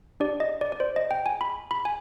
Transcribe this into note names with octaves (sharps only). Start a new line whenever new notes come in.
D4 G4 D5
D#5
D5
D5
C5
D#5
G5
G#5
B5
B5
G#5